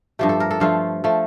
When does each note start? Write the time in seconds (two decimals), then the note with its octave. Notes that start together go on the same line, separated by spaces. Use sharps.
0.19 G2 F3 A3 G4
0.29 A4
0.40 A#4
0.51 A4
0.60 G2 F3 A3 F4
1.04 F3 A3